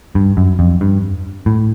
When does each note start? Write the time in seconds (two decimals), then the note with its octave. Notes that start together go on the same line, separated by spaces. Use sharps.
0.15 G2
0.37 F#2
0.59 F2
0.81 G2
1.46 A2